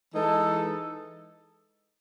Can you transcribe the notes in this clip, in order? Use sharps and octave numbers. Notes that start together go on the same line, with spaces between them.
E3 G#3 D#4 A4